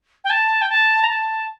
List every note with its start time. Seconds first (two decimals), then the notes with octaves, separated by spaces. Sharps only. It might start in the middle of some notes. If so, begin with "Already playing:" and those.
0.24 G5
0.30 A5
0.61 G5
0.69 A5
1.03 A#5
1.09 A5